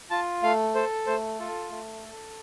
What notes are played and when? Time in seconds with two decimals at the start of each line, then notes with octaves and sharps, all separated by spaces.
0.10 F4 A5
0.43 A3 F5
0.75 A4 C5
1.07 A3 C5
1.39 F4 A4
1.71 A3
2.04 A4